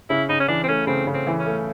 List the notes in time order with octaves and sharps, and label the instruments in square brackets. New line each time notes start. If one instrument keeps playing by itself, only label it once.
[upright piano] C#3 [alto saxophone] E4
[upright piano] C#3 [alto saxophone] D#4
[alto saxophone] C#4
[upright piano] E3 [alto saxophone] D4
[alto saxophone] C4
[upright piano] A3 [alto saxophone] C#4
[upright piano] C#3 [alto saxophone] C4
[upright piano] C#3
[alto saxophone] C4
[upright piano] E3
[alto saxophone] C#4
[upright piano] A3